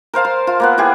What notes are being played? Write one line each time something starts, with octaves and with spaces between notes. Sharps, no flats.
A#4 C5 F5 A5
C6
F4
A#3 B3 F#5
E4 G4 G#4